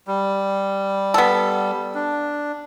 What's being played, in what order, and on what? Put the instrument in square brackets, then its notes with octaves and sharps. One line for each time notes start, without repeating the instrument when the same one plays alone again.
[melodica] G3
[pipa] B3 A4
[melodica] D4